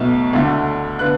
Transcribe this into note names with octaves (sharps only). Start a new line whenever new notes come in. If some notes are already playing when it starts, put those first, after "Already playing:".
Already playing: B1 B2 A3
D2 D3 A3
D3 B3 F#6